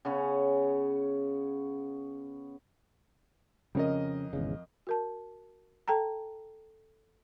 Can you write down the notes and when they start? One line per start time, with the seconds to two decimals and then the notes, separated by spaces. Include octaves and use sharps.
0.05 C#3 B3 C#4
3.75 F2 C#3 C#4 A#4 D#5
4.33 G#1 E2 C#3
4.87 F#4 A#4 A5
5.88 A4 G5 A5 A#5